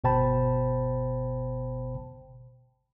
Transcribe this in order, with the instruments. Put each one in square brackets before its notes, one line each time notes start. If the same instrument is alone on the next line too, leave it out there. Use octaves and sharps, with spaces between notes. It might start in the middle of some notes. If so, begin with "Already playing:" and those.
[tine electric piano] G1 B2 C5 G5 A5 B5